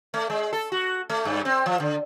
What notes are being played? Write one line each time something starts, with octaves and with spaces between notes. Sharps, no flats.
A3
G#3
A4
F#4
A3
G2
C4
F3
D3